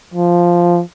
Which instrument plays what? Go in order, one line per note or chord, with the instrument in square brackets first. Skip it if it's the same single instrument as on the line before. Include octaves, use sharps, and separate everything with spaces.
[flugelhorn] F3